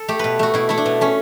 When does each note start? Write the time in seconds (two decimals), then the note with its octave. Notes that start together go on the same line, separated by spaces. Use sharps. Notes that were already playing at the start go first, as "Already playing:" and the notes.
Already playing: A4
0.08 A3 G4
0.19 B2 B4
0.39 A3 F#4
0.54 B2 E4
0.69 A3 E4
0.78 D4
0.86 B2
1.01 A3 C#4